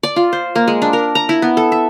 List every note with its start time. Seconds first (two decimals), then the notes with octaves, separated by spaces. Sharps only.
0.03 D5
0.16 F4
0.33 C5
0.55 A#3
0.68 G#3
0.82 D4
0.93 A#4
1.15 A#5
1.29 E4
1.42 B3
1.57 A4
1.72 E5